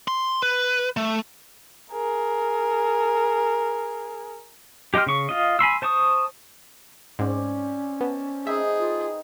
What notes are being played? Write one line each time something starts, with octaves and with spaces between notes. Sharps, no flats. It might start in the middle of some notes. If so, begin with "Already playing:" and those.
C6
B4
A3
G#4 A#4
G4 D#5 G5 C6 F6
C#3 C#6
F4 D#5
G#5 B5 C6 E6
C5 A5 C#6 D#6
G#2 C4 C#4 D5
B3 A5
C4 D#4 G#4 B4 E5
F4